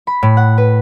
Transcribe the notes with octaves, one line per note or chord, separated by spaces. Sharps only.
B5
A2
F#5
B4